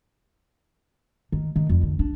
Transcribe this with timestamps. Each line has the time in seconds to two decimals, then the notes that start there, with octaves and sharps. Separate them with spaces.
1.32 D#3
1.56 D#3
1.69 F2
1.83 D3
1.99 D4